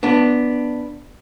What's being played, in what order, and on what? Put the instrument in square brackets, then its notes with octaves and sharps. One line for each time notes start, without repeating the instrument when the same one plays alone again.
[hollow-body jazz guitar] B3 D4